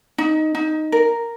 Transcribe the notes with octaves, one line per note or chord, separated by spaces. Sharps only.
D#4
D#4
A#4